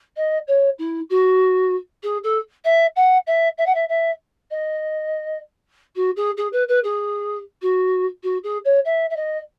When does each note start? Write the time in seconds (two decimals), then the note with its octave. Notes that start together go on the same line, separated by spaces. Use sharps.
0.16 D#5
0.47 C#5
0.79 E4
1.10 F#4
2.03 G#4
2.23 A4
2.65 E5
2.96 F#5
3.27 E5
3.58 E5
3.66 F#5
3.74 E5
3.89 E5
4.51 D#5
5.96 F#4
6.16 G#4
6.37 G#4
6.52 B4
6.68 B4
6.84 G#4
7.62 F#4
8.23 F#4
8.43 G#4
8.65 C#5
8.85 E5
9.10 E5
9.16 D#5